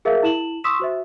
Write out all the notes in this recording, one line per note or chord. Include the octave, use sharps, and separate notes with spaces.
G#4 A#4 E5 F5
E4 E7 F#7
C6 C#6 D#6 E6 B6 E7
F#4 C5 E5